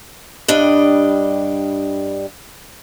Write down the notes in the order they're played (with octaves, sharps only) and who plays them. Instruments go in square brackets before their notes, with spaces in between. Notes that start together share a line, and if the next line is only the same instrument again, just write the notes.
[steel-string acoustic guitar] G2 G3 D4 D#5